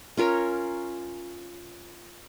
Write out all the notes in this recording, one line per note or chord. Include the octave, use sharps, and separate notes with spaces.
C#4 F4 A#4 C#5